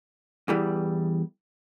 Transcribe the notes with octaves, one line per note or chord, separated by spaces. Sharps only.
E2 E3 G3